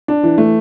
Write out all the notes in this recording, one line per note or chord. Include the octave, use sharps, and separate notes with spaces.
D4
E3
A3